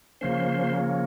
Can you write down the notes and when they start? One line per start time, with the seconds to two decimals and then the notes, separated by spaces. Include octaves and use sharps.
0.21 C#3 F3 A#3 C#4 C5